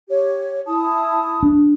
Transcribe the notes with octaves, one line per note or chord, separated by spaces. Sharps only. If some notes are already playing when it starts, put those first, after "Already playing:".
G4 C#5
E4 A5 D#6
D4